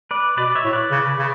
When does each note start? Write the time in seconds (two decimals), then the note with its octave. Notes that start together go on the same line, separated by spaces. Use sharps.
0.11 B4 D5
0.37 B2 B4 D5
0.55 C#5 E5
0.64 A2
0.73 B4 D5
0.91 C#3
1.18 C#3